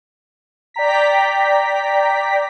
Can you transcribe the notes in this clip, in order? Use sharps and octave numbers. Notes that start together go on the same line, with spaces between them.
D5 G5 A#5 B6